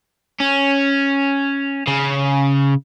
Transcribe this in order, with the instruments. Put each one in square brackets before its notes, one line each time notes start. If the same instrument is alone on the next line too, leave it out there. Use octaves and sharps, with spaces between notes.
[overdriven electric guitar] C#4
C#3